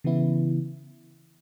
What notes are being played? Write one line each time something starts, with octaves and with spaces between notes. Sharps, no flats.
C#3 E3 B3 E4